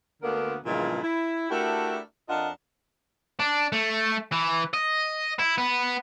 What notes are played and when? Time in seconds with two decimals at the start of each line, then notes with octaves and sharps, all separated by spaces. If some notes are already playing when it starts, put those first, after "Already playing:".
0.23 D2 D3 A#3 B3 A#4
0.66 G2 A#2 C#3 E3 F3 G#3
1.02 E4
1.50 A3 D4 E4 F#4 G4 A#4
2.29 F2 D4 F4 A#4 D#5 F#5
3.40 D4
3.72 A3
4.32 E3
4.74 D#5
5.39 E4
5.58 B3